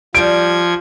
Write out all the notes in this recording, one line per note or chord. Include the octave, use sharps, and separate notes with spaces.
F3 G3 G#6 D7